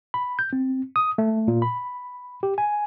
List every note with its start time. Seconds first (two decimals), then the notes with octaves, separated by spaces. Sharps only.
0.14 B5
0.39 G6
0.53 C4
0.96 D#6
1.18 A3
1.48 A#2
1.62 B5
2.43 G4
2.58 G#5